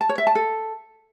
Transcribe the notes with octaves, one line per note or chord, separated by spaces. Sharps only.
A5
C#5
E5
A5
A4